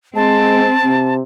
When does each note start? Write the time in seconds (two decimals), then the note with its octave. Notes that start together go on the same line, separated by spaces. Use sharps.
0.16 G#3 C4 A5
0.85 C3